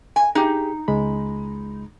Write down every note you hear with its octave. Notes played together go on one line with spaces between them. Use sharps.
G#5
D#4 G4 G#4
C#2 G#3 B5